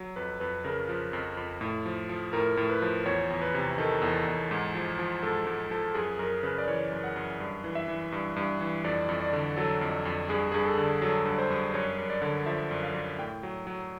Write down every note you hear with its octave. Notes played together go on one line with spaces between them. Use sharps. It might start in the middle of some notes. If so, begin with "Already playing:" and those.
Already playing: F#3
F2 B4
F2 B4
C#3 A#4
F3
F2
F2
A2
F3
F3
A2 A#4
A2
B4
F3
E2 C#5
E2
B4
C3
D#3 A4
E2
E2
G#2
F3
F3
G#2 A4
G#2 A4
F3 A4
F#2 G#4
F#2 A#4
C#3 B4
D5
E3 C#5
F#2
F#5
F#2
G2
E3
E5
E3
G2
G2
E3
F2 D5
F2
D5
D3
F#3 A4
F2
F2
G2 G#4
G2 G#4
A4
D3
F#3 A4
G2
C5
G2
F#2 C#5
F#2
D5
D3
F3 E5
F#2
F5
F#2
A2 G5
F#3
F#3